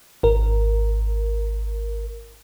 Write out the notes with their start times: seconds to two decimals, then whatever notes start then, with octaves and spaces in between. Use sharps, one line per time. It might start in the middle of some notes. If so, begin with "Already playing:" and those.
0.23 G#1 A#4